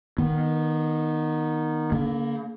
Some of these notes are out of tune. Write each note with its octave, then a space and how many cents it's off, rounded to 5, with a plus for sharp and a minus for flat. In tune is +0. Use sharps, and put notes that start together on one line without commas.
D#3 +0 B3 -25
D3 -45 A#3 +0